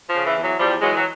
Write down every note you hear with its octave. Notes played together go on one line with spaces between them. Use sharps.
F3
C#3
E3
E2
E3 F#3
E2 F3 G3
E3 F#3 G#3
F#3